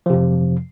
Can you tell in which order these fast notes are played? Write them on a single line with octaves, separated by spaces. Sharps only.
F3 C3 F2